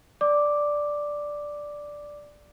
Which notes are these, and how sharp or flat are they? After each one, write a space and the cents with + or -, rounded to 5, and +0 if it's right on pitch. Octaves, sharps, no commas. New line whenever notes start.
D5 +0 D6 +0